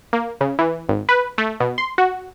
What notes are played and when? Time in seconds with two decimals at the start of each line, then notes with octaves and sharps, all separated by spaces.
0.13 A#3
0.41 C#3
0.59 E3
0.89 G#1
1.09 B4
1.38 A3
1.60 B2
1.78 C6
1.98 F#4